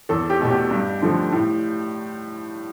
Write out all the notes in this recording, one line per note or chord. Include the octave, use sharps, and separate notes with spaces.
E2 A4
G4
B2 A3
G4
G2
D3 F3 A3
A2